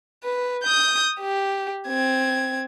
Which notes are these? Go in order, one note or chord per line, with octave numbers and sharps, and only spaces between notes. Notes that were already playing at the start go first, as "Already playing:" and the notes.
B4
D#6 G6
G4
C4 G#6